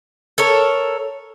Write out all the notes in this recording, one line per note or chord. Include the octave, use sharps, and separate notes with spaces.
A4 A#4 C#5